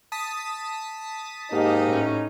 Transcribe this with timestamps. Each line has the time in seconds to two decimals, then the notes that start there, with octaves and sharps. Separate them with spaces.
0.12 A5 D#6 B6
1.52 G#2 A#3 D#4 G4
1.88 A2 C#4